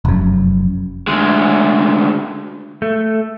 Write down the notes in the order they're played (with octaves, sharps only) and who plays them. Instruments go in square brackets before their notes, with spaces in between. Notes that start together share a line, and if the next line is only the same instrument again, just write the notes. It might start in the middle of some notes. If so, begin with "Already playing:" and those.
[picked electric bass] F1 F#2
[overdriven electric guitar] D2 G#3
[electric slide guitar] A3